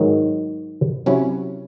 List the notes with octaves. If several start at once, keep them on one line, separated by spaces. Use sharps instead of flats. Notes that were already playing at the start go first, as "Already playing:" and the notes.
Already playing: G#2 D#3 F#3
C3 F#3 C#4 E4